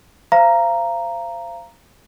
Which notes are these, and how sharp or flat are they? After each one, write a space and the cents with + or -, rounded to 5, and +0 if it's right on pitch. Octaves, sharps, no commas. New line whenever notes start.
C5 +0 F5 -30 A#5 +0